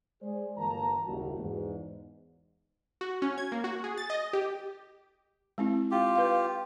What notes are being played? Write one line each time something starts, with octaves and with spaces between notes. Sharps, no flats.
G#3 G#4 C5 D5
G1 E3 A#3 F#4 A5 A#5
F#1 D#2 D#3 G3 E4 F#4
E2 G#2
F#4
C#4
G#6
A#3
F#4
G#4
A6
D#5
G4
G#3 C4 E4
F4 G4
B4 F5